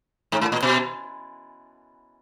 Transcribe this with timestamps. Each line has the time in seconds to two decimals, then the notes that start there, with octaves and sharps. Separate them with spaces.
0.32 G#2
0.41 A2
0.52 A#2
0.63 B2